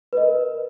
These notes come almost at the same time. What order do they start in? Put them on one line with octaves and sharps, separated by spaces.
B4 D#5 A#4